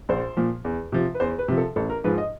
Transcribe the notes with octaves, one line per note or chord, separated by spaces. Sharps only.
A#1 C5
A#2 F3
E2
C3 F3
B4
E2 C5
B4
C3 F3
A4
A1 A4
A#4
G#2 F3 B4
D#5